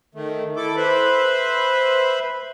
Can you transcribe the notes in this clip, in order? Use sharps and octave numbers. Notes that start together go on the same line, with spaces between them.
D#3 A3
E4 A4 D6
B4 C5 E5 B5